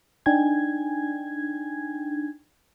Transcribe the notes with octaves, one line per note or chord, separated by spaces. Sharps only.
D4 D#4 G5 G#5 G#6